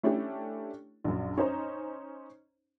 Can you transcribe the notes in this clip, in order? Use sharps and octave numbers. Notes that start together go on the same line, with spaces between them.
A3 C#4 D4 E4 G4 A4
A#1 F#2
C#4 D#4 C5 A#5